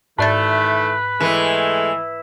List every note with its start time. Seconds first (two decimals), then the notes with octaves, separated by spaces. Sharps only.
0.19 G#2 D#3 E3 A3 B4 D5 A6
1.21 E3 G#3 A3